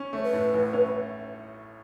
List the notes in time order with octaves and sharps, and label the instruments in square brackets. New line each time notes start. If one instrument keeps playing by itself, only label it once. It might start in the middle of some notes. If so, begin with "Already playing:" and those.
Already playing: [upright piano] C#4
[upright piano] A3 [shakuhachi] C#5
[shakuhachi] B4
[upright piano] A2
A1
C#4